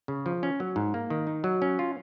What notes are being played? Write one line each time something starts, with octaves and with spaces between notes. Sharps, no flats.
C#3
F3
C#4
F#3
G#2
A#3
D#3
D#4
F#3
C#4
F4